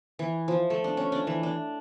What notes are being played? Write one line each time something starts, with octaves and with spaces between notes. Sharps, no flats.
E3
F3
A3
D4
C#4
D4
E3
D4